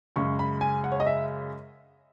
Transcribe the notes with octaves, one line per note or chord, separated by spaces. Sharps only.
F#2 C#3 G#3 C#6
B5
G#5
F#5
C#5
D#5
E5